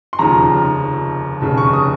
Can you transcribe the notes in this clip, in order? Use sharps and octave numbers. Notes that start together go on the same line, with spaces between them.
C6
F1 D#2 C#3 F3 A#5
F1 D#2 C#3
C#6
D#6